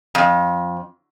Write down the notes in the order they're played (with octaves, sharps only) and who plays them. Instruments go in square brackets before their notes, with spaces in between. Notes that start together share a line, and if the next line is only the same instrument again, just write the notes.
[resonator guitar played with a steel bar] F2